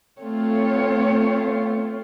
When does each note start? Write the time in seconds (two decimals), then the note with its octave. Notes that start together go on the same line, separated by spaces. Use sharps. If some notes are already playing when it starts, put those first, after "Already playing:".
0.21 A3 C4 F4 C#5